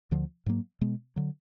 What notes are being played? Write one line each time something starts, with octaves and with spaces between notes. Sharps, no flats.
D2 D3 F3
G#2 F#3 A#3
B2 G#3 B3
D3 F#3